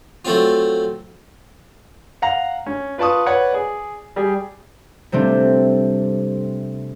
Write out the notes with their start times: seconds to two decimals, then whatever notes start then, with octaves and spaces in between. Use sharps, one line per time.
0.25 F#3 A3 C4 F4
2.22 F5 F#5 A#5
2.66 C#4
2.98 F4 B4 D5 A5 C#6 D#6
3.26 B4 C#5 D5 F#5
3.53 G#4 D5
4.16 G3 G4 G#4
5.12 C3 G3 A3 C4 D4